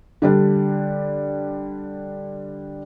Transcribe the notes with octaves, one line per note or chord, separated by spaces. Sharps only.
D3 G3 D4